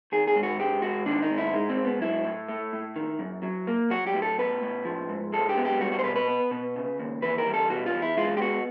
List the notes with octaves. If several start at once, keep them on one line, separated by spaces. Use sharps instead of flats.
D#3 G#4
G#4
G#2
F#4
G#3 G4
G#2 F#4
D#3 D4
D#4
G#2
E4
G#3 D#4
C4
G#2
B3
F#3 E4
A2
A3
A2
D#3
F#2
F#3
A#3
F#3 F#4
G4
A2
A4
B3 B4
A2
F3
G#2
G#3 A4
G4
B3
G4
G3 F#4
F#4
C5
B2 B4
B4
B3
B2
C#3
D#2
E3 B4
A#4
G3
A4
B2 F#4
F4
E2
E4
G#3 F4
G4
B3 F#4